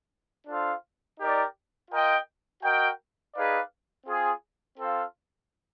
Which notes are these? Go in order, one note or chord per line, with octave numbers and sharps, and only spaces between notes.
D4 F4 A4 C5 F5
D#4 G4 A#4 D5
F4 A#4 D#5 G5
F#4 A#4 D#5 G5
D#4 G#4 B4 D5 F5
C4 F4 G#4
C4 F4 A4 C5 F5